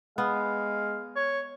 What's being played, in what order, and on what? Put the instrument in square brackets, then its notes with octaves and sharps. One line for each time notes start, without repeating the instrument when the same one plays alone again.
[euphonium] G#3 [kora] B3 [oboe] F5
[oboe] C#5